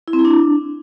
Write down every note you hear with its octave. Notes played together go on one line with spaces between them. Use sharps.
E4
C4
E4
D4